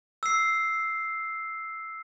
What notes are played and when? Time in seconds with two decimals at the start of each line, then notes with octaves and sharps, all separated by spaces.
0.23 E6 C7